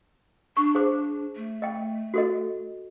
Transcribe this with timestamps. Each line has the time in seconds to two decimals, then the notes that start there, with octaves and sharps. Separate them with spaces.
0.57 D4 C#6
0.75 G#4 C5 D6
1.36 A3
1.62 D#5 G5
2.14 F#4 A4 D#5